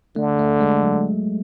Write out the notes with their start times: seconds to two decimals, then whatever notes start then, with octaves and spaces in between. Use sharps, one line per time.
0.16 D3 A3
0.39 A3
0.61 G#3
0.83 F#3